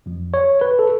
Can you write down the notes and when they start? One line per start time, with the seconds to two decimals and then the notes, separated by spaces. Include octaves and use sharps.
0.06 F2 F3
0.34 C#5
0.61 B4
0.79 A4